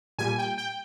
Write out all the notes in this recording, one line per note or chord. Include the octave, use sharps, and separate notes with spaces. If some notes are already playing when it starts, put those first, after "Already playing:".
A#2 G3 G#5
G5
G5